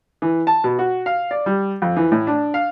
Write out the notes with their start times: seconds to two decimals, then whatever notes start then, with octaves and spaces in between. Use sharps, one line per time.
0.22 E3
0.47 A5
0.64 B2
0.79 F#4
1.06 F5
1.31 D5
1.46 G3
1.82 F2
1.97 E3
2.12 A2
2.27 D4
2.54 F5